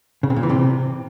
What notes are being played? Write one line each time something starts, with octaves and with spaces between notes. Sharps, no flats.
C#3
C3
A#2
E3
C3